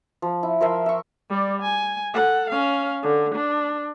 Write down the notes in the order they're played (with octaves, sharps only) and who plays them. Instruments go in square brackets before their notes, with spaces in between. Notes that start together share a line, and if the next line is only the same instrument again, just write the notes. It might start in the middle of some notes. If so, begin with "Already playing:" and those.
[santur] F3
E4
F3 A#4 E5 C6
E5 C#6
[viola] G3 D5
G#5
A4 F#5
C#4 F5
D3
D4